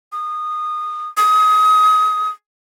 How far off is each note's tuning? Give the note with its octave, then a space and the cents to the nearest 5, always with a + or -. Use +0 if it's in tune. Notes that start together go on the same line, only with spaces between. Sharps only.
D#6 -20
D#6 +25